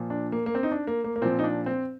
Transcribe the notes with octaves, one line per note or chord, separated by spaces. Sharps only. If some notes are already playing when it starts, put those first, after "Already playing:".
Already playing: A#2 F3
D4
A#3
A#3
C4
D#4
D4
A#3
A#3
A#3
A#2 F3 C4
D#4
D4
C4